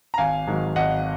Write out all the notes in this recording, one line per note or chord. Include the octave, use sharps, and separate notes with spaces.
A#5
G#1 F5 G#5
G#2 D#3 F#3
G#1 D#5 F#5